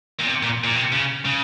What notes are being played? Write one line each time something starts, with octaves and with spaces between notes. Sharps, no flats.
A#2
C3
A#2
A#2
C3
C#3
C#3